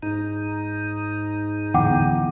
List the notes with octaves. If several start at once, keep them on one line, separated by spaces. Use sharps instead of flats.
G#2 D#4
D1 E2 F#5 G5 D6